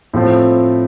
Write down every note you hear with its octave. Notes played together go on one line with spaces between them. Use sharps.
A2 F3 A3 C4 F4